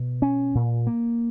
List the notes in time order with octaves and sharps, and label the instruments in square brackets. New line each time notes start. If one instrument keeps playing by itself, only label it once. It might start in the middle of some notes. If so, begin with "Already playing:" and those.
Already playing: [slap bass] B2
C#4
A#2
A#3